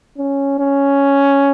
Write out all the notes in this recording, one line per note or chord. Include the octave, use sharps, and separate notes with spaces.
C#4
C#4